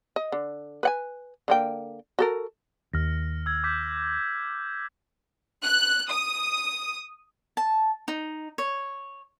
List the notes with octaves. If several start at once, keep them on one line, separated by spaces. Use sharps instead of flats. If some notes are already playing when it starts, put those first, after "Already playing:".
D#5
D3
B4 F#5 G#5
D3 A#3 G5
F#4 A4 A#4
D#2 F6 A#6
E6 G#6
D6 G6 B6
F#6
D#6
A5
D#4
C#5